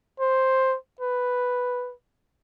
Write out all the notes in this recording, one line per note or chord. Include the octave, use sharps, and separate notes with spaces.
C5
B4